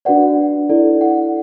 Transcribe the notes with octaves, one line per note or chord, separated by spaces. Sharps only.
D4 F#4 B4 D5 F#5
E4 A4 D5
F#5